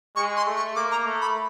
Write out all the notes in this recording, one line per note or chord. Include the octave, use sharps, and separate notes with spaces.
G#3 C#6
C6
A3
C#6
A#3 D6
A#5
A3
B5